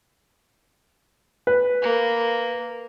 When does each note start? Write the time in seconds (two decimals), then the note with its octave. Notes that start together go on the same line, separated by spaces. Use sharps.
1.47 B4
1.82 A#3